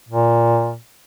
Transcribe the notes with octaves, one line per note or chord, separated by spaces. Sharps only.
A#2